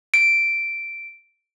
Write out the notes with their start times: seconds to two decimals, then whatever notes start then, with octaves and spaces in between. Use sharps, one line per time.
0.14 D7